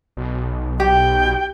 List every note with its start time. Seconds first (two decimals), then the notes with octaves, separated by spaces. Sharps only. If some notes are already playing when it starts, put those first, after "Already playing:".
0.17 B1
0.80 G4 G5